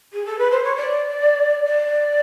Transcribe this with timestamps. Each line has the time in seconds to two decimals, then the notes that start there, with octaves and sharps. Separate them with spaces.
0.12 G#4
0.25 A4
0.38 B4
0.50 C5
0.63 C#5
0.75 D5
1.64 D5